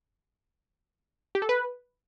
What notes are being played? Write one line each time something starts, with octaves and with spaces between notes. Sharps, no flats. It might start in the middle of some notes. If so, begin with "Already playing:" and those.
G4
A4
B4